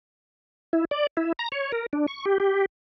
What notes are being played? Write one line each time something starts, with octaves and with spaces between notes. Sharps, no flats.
E4
D5
E4
A#5
C#5
A#4
D4
C#6
G4
G4